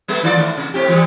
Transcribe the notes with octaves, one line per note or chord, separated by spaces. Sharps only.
G3 A3 B3
D#3 F4 D5
A3 E4
C3
A2 C4 G4
E3 F#3 G3